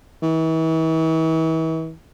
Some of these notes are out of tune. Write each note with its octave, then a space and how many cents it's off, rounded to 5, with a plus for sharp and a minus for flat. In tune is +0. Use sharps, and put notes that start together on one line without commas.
E3 -40